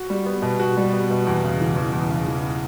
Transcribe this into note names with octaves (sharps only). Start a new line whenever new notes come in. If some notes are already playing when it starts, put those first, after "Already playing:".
Already playing: F#4
G3
B3
B2
F#4
G3
B3
B2
E2
C#3
E3
E2
E2
C#3
E3